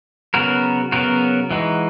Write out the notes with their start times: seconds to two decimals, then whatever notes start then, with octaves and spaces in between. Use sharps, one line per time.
0.34 C#3 F#3 B3 F#4 A#4
0.92 C#3 F#3 B3 F#4 A#4
1.51 E3 G#3 D#4 F#4